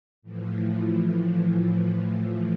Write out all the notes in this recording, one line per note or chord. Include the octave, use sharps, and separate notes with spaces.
A2 E3 F3